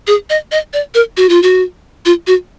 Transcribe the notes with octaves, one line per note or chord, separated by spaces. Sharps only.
G#4
D#5
D#5
D5
A#4
F#4
F4
F#4
F4
F#4